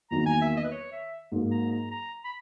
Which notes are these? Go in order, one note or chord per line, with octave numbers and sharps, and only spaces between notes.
E2 D#3 F#3 A#3 A#5
G#5
E5
D#5
B4
C#5
E5
G#2 F#3 A#3
A#5
A#5
A#5
B5